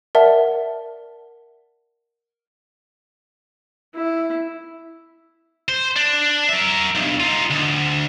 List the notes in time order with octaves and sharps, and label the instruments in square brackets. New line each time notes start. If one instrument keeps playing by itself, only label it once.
[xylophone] A#4 D5 E5 F#5 A5
[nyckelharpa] E4
[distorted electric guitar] C5
D4
A#4 E5
B1 G2
D#4 F4
D2